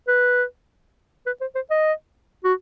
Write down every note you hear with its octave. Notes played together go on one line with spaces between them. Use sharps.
B4
B4
C5
C5
D#5
F#4